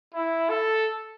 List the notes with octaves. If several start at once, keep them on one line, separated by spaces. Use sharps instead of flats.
E4
A4